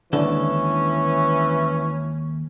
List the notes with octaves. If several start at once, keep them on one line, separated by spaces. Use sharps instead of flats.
D#2 D3 E3 G#3 C#4 A4